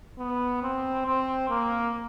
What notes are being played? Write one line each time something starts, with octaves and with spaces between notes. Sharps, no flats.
B3
C4
C4
A#3